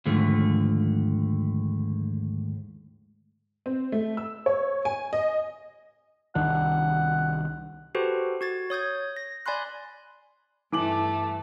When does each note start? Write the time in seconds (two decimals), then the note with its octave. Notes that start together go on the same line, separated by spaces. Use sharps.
0.05 D#2 G#2 D3 F3 A3
3.66 C4
3.92 A3
4.17 E6
4.46 C#5
4.85 G#5
5.13 D#5
6.35 C2 D#3 D4 F#5
7.95 F#4 G4 A4 B4 C5
8.41 F#4 G#6 A6
8.70 C#5 D#6 G6 G#6
9.17 A#6
9.46 D5 G#5 B5 C6 F#6
10.72 G2 E3 A3 D6 F#7